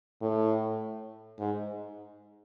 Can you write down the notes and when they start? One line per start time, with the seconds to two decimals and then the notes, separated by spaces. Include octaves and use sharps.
0.22 A2
1.39 G#2